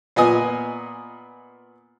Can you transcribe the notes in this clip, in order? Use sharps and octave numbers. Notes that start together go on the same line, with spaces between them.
A#2 B3 D#5 G#5 D#6